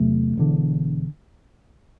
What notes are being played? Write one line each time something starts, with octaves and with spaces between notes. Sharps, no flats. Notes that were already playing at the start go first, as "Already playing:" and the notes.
Already playing: E2 C3 F#3 A3
E1 E2 D3